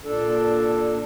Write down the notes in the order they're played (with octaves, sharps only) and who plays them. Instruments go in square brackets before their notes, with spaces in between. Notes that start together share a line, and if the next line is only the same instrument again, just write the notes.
[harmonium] A#2 D4 A4